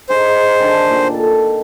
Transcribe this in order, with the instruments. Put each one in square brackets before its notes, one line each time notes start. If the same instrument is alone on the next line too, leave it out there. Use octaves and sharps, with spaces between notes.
[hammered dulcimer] D#4 G#4 [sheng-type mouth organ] C5
[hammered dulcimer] D#3 D4
A#2 D#3
A4